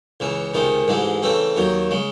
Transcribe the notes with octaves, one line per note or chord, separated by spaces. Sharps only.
C#2 C#3 E3
C#2 C3 D#3 G#3
A1 G#2 E3 G#3
C#3 E3 A3 C4
D#2 D#3 F#3
C#3 G#3